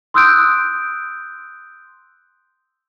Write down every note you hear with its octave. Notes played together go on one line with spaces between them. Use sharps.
C6 D#6 E6 F#6 G6 D7